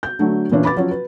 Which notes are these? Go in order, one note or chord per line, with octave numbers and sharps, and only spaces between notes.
G6
D3 F#3 A3
A#2 E3 C#4 D4
B4 B5 D6 A6
F3 F#3 C#4
B4